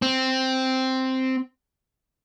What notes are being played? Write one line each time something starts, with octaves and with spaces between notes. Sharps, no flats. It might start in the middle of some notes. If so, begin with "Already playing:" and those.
C4